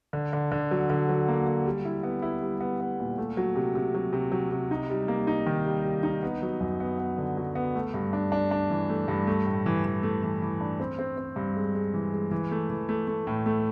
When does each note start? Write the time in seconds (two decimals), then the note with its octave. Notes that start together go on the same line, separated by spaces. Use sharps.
0.13 D3
0.33 D3
0.52 D3
0.71 F#3
0.90 D3
1.09 F#3
1.28 A#3
1.47 A#3
1.66 G3
1.85 E4
2.03 B3
2.22 E4
2.42 G3
2.60 B3
2.80 B3
3.00 A#2
3.18 A3
3.37 F#3
3.56 C3
3.75 C3
3.95 F#3
4.13 C3
4.32 F#3
4.51 C3
4.71 D#4
4.90 G3
5.08 A#3
5.27 D#4
5.46 D#3
5.66 G3
5.84 G3
6.03 D#4
6.22 B3
6.42 F#3
6.60 F#2
6.80 B3
6.98 B3
7.18 D3
7.37 F#3
7.55 B3
7.75 A3
7.94 G2
8.13 D4
8.32 D4
8.51 D4
8.70 E3
8.89 A3
9.08 G2
9.27 A3
9.46 A2
9.66 E3
9.85 E3
10.03 A3
10.23 E3
10.42 E3
10.61 D4
10.80 C4
10.99 C4
11.18 C4
11.36 G2
11.56 G#3
11.75 G#3
11.94 E3
12.13 G#3
12.31 E3
12.51 A3
12.70 E3
12.89 A3
13.08 A3
13.27 A2
13.46 A3